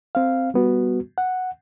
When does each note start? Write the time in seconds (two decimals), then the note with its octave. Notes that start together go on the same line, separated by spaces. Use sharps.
0.15 C4 F5
0.54 G3 B3 F#4
1.18 F#5